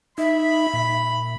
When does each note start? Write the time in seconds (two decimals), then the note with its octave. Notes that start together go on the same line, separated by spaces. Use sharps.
0.18 D#4 E5 B5
0.73 A#2